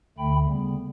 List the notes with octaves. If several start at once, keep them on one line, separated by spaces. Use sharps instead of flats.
D2 D3 A3 G5 B5
C#3 G3 B3